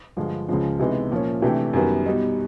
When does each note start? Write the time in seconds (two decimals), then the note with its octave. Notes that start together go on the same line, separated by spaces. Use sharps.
0.17 G2 D3 F3 G#3
0.49 C#2 C#3 F3 G#3
0.79 C3 E3 G#3 B3 D#4
1.11 A#2 F3 A#3 C#4
1.42 C3 E3 A3 D4 G4
1.73 F#2 D#3 G3 B3
2.06 B2 G3 B3 D#4